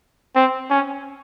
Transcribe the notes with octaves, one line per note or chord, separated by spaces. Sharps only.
C4
C#4